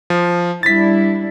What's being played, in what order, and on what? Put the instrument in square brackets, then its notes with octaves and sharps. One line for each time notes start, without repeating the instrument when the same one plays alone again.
[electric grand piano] F3
[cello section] G3 D4 E4 [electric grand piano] A6 B6